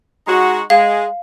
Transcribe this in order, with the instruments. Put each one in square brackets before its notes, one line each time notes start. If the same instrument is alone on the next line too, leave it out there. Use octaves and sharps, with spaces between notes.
[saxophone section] G#3 D#4 F#4
[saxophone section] G#3 [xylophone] F5